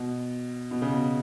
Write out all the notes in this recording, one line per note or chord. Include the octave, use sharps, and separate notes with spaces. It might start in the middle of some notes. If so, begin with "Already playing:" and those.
Already playing: B2
B2
C#3
B2